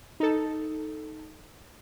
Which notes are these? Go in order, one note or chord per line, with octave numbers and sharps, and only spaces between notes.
D#4 A4